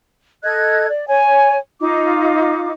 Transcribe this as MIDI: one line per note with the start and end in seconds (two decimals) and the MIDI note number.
0.43 0.87 69
0.43 0.87 75
0.43 0.87 90
0.43 0.87 92
0.89 1.06 74
1.09 1.58 73
1.09 1.58 80
1.80 2.72 63
1.80 2.72 65
1.80 2.72 86